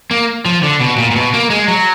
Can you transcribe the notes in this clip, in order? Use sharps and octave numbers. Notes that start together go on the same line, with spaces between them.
A#3
F3
D3
B2
A#2
A#2
B2
A#3
G#3
F#3